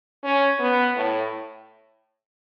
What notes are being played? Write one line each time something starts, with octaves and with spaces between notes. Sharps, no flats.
C#4
B3
A2